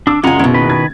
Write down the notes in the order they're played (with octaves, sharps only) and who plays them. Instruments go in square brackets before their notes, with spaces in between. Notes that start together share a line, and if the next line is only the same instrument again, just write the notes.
[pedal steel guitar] D4 [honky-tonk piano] D6 E6
[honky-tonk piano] C#2 F#2 [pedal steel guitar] G#3 F#5 A#5 [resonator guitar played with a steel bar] F4 G#5
[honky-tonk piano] F#1 [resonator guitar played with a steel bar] B2 E4
[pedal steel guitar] D#3 B4
[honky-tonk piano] G#6 A6